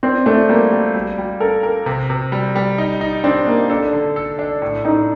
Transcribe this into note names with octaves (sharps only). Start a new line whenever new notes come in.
C4 D4
A3 D4
G3 A#3
G3
G3
G3
A4 A#4
A#4
C3
C3
G3
G3
D#4
D#4
C4 D4
A#3 D#4
D4 A4
D3
A4
D4
A2
A2 D#4